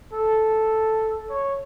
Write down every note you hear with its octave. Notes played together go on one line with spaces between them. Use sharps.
A4
C#5